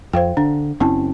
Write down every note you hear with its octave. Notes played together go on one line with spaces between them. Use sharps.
F2 C5 F5 G5
D3 D4
F#1 C4 C#4 E4 A5